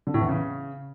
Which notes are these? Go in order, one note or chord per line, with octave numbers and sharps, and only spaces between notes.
D3
A2
E2
C#3